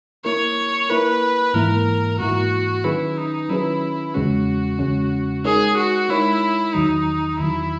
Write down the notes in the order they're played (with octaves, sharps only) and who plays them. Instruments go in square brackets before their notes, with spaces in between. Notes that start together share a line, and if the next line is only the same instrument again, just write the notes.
[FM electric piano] A#3 E4 A#4 [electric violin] C#5
[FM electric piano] A#3 E4 A#4 [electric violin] B4
[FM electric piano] G#2 E3 A#3 E4 [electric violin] A#4
[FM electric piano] G#2 E3 A#3 E4 [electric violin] F#4
[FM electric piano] D#3 F#3 C#4 G#4 B4 [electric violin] E4
[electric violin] D#4
[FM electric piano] D#3 F#3 C#4 G#4 B4 [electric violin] E4
[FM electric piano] E2 C#3 G#3 C#4 [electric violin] F#4
[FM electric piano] E2 C#3 G#3 C#4
[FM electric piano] G#3 D#4 A#4 C#5 [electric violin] G#4
[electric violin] F#4
[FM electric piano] G#3 D#4 A#4 C#5 [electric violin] E4
[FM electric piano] E2 D#3 F#3 [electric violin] D#4
[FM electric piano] E2 D#3 F#3 [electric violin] E4